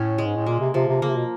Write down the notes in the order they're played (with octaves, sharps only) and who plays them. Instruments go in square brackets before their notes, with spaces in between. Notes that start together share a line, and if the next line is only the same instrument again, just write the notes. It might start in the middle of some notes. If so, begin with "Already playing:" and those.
Already playing: [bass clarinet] A2 [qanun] C#4
[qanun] G#3
[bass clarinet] G#2
A2
[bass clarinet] A#2 [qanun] A#3
[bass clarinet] C3
[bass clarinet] C3 [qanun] F3
[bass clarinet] C3
[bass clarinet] C#3 [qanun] A#3
[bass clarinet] C3
B2